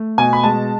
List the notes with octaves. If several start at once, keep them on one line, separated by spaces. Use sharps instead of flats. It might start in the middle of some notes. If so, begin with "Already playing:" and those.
Already playing: A3
B2 G#5
B5
G#3 A5